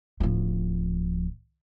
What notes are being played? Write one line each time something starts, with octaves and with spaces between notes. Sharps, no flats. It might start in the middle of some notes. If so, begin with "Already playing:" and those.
D1 F3